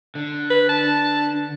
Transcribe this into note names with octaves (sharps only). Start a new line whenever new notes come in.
D3
B4
D4 A5